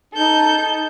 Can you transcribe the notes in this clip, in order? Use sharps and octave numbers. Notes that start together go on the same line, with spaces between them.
D#4 A4 G6